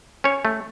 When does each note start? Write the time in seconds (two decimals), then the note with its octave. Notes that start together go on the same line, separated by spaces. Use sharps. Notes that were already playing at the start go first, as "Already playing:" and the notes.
0.24 C#4 C#5
0.45 A3